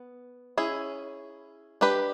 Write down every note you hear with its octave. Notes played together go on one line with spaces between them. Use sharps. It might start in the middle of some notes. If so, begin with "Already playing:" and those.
Already playing: B3
C#4 E4 G#4
D4 G4 B4